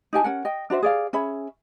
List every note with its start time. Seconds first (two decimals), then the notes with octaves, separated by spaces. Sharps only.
0.13 D#4 G4 G#5 A5
0.24 C#4 A#4 F#5
0.45 D#5 G5
0.70 D4 F#4 C5 E5
0.82 G#4 D5 F5
1.13 C#4 G#4 E5 B5